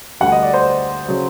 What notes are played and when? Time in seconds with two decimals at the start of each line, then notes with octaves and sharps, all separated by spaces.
0.21 D2 D3 G3 F#5
0.32 D#5
0.43 D5
0.54 C5
1.08 C#3 F#3